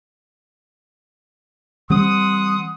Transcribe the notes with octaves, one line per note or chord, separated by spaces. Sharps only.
E3 G3 C4 F#5 C6 D#6